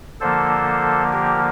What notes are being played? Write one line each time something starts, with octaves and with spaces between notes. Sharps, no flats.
D3 F3 A#3 A4 C5
G4 A#4